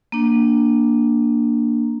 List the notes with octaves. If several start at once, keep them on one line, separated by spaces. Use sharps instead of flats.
A#3 D4